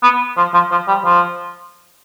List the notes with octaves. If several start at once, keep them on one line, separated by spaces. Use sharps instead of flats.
B3
F3
F3
F3
G3
F3